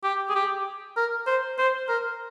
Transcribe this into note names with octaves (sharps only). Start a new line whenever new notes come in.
G4
G#4
G4
A#4
C5
C5
A#4